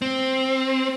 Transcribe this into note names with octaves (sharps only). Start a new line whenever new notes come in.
C4